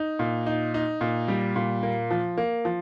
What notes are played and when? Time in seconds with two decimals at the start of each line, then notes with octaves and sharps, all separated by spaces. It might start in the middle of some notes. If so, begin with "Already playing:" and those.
Already playing: D#4
0.19 A#2
0.46 D#4
0.74 D#4
1.01 A#2
1.28 G3
1.56 A#2
1.83 A#3
2.11 F3
2.38 A#3
2.65 F3